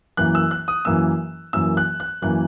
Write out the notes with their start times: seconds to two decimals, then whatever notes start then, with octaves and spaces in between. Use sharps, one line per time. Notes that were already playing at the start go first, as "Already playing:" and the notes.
0.17 F#2 E3 A#3 F#6
0.35 E6
0.51 F#6
0.68 D#6
0.85 F#2 E3 A#3 E6
1.53 F#2 E3 A#3 E6
1.77 F#6
2.00 F#6
2.22 F#2 E3 A#3 F#6